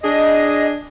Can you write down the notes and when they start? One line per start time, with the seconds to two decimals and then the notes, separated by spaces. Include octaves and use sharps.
0.03 D4 G#4 D#5